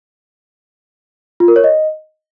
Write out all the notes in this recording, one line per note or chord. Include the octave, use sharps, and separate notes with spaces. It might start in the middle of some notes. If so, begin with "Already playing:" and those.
F4
A#4
C#5
D#5